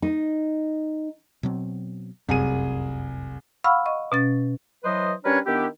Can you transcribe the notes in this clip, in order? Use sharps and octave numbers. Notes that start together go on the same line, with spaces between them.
D#4
B2 F#3 C4
F1 C2 F#2 G#4 D#7
F5 F#5 B5 C#6 E6 F6
D#5 C#6
B2 C#4 A6
E3 F#3 B4 C5 D#5
G3 C#4 D4 A#4 B4 C#5
D#3 B3 D4 E4 G4